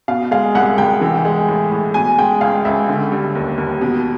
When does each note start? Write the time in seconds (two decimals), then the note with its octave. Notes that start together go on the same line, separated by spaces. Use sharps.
0.08 B2 F5
0.31 G#3 F5
0.55 C2 F#5
0.78 C2 G5
1.01 E3
1.25 G#3
1.48 A2
1.71 A2
1.94 B2 G#5
2.18 G#3 G5
2.41 C#2 F5
2.65 C#2 E5
2.89 D3
3.12 G3
3.35 D#2
3.58 D#2
3.81 B2